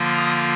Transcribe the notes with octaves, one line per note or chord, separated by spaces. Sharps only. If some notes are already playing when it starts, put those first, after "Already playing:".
Already playing: D3 F3 A#3 F4
D#6